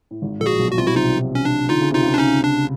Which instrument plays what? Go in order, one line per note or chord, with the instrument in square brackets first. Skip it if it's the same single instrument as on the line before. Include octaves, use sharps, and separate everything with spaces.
[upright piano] A2
G#1 G#2
[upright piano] A#1 A#2 [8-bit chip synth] A4
[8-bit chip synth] F#4 G#4
[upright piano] B1 B2
[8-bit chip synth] F#4
[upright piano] C2 C3 [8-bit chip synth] F4
[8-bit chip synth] E4 F#4
[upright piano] C2 C3 [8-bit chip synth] D#4 F4
[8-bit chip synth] C#4
D4
[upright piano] D3 [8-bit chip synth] D#4 F4
[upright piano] C#3
[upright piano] C3 [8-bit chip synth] D#4 F4
[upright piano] C#2 C#3
[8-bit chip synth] D4
C#4 D#4
D4